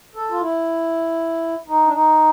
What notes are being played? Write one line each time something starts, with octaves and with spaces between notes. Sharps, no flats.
A4
F4
E4
D#4
D4
D#4